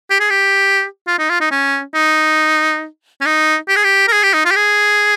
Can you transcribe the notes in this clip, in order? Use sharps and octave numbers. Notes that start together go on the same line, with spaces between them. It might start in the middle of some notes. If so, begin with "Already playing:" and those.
G4
G#4
G4
F4
D#4
F4
D#4
C#4
D#4
C#4
D#4
G4
G#4
G4
A#4
G#4
G4
D#4
F4
G4
G#4